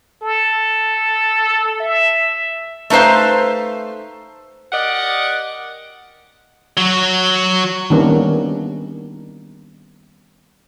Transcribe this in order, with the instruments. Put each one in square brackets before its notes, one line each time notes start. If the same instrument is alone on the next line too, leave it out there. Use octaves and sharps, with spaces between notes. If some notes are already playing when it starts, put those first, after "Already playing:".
[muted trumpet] A4
E5
[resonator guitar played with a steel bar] A3 D#4 B4 C5 F5
[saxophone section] G4 A#4 D5 D#5 F#5
[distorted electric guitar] F#3 F#4
[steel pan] D#3 G3 A#3 B3 C#4 D4